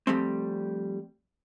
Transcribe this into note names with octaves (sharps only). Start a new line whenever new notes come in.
F3 G3 A3 C4